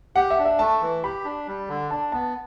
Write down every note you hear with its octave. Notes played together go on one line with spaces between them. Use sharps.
G4 F#5
E5
D4
E5
A3 A5
E3
G4 B5
D4
G3
D3
D4 A5
B3 A5